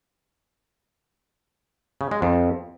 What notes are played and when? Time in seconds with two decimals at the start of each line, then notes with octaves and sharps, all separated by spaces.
2.01 C#3
2.11 G#3
2.22 F2